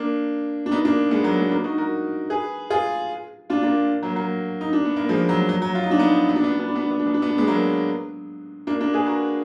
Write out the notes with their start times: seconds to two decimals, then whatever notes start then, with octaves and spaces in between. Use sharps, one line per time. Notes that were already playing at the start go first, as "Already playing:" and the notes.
Already playing: A#3 D4
0.66 D4
0.71 B3 D#4
0.85 A#3 D4
1.11 G#3 B3
1.24 F#3 A#3
1.37 G#3 B3
1.51 A#3 D4
1.64 D#4 F#4
1.78 F#4 A#4
2.30 G#4 B4
2.70 F4 G#4
3.50 D4 F4
3.63 A#3 D4
4.03 F#3 A#3
4.16 F#3 A#3
4.61 D#4
4.73 D4
4.85 B3
4.96 A#3
5.09 F3 G#3
5.29 F#3
5.49 F#3
5.62 F#3
5.75 F4
5.84 D#4
5.91 D4
5.99 B3 D#4
6.29 B3
6.36 D4
6.44 B3
6.52 D4
6.59 B3
6.68 D4
6.75 B3
6.83 D4
6.91 B3
6.99 D4
7.06 B3
7.14 D4
7.22 B3
7.30 D4
7.38 G#3 B3
7.47 F#3 A#3
8.67 A#3 D4
8.80 A#3 D4
8.94 G#4 B4
9.06 F#4 A#4